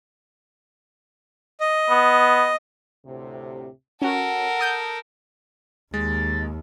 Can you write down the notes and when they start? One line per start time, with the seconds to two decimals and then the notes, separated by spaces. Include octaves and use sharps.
1.60 D#5
1.90 B3
3.06 D2 A2 C3
4.02 C#4 F#4 A4 A#4 F#5
4.59 A5 D#6 G6
5.94 D#2 G#3 A6